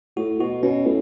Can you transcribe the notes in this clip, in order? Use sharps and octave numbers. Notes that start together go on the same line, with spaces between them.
A2 F#4
B2 F#4
B2 C#4
A2